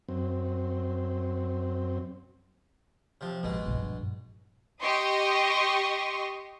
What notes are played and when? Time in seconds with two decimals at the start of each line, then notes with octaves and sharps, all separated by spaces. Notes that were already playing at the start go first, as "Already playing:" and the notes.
0.09 F#2 C4
3.21 C3 F3
3.43 A1 D#2 B2 G#3
3.66 A#1 G2
4.81 G4 D#5 C6 C#6 D#6